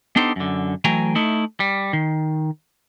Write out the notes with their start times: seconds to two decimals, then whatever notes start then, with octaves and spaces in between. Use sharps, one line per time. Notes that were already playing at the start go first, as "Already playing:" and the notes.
0.16 B3 D4 D#4 G4 A4 C5
0.36 F#2 D3
0.84 E3 F#3 A3 G5 G#5 A#5
1.15 A3 D#4 E4
1.60 G3
1.93 D#3